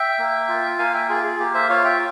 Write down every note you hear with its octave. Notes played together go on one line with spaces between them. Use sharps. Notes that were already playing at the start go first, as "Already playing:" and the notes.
Already playing: E5 G5
A#3
F4
A#3 F5 G#5
E5 G5
F4 G#4
G#4
A#3 G4
C5 E5
F4 C#5 F5
E5 G5